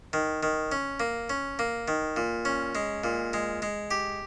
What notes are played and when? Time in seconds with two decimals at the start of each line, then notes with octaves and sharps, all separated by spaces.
0.13 D#3
0.43 D#3
0.72 C#4
1.00 A#3
1.30 C#4
1.59 A#3
1.88 D#3
2.16 A#2
2.45 C#4
2.75 G#3
3.04 A#2
3.33 G#3
3.62 G#3
3.91 G4